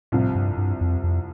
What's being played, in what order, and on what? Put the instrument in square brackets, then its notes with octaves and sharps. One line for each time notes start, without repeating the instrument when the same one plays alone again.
[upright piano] C2 C3 F3 [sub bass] A2
[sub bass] G2
G2
F2
F2